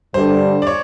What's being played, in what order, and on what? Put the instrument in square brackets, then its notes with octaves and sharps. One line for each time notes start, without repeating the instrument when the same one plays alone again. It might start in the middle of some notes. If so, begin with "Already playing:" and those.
[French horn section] G2 D3 G3 [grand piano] C5
[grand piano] D5
C#5